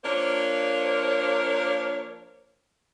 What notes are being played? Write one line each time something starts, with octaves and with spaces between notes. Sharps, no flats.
F3 A#3 D4 A#4 C5 C#5